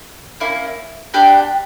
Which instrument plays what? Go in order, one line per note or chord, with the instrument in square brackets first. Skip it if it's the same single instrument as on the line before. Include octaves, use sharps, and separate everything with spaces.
[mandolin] A#3 C#4 E4
B3 D4 G4